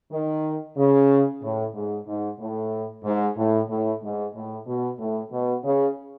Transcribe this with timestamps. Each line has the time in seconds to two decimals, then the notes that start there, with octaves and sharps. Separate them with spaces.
0.12 D#3
0.77 C#3
1.42 A2
1.74 G#2
2.07 G#2
2.39 A2
3.04 G#2
3.37 A2
3.69 A2
4.02 G#2
4.34 A2
4.67 B2
4.99 A2
5.31 B2
5.64 C#3